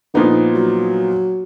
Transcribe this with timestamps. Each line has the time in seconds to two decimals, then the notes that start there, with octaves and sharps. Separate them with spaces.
0.14 A#2 D3 F3 B3 D#4
0.55 F#3